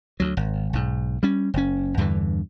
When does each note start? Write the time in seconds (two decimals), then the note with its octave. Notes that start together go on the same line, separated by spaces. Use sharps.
0.20 D2 F#3
0.37 G#1
0.73 B1 G#2
1.23 G3 C#4
1.54 F#1 C#4
1.97 E2 G2 D3 E3